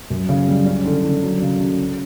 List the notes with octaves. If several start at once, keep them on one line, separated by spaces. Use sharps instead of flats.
F#2
C#3
G3
C#4
D3
D3
F#3
C#3
C#3
C#4